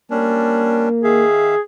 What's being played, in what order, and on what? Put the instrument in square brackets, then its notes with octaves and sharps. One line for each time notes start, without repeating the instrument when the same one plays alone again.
[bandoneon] G3 C#4 D4 [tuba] A#3
[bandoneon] D#3 E5 F5 [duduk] G#4